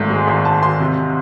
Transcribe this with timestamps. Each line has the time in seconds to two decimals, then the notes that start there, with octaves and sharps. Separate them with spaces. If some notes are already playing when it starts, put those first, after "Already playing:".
Already playing: G#1 G#2 A3
0.10 G#3
0.27 G#1 C6
0.45 G#2 A5
0.62 G#1 C6
0.80 C3